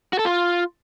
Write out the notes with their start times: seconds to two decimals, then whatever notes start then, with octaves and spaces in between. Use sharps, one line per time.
0.13 F#4
0.19 A4
0.25 F4